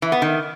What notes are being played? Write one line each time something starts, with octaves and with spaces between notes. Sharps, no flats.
E3
B3
D#3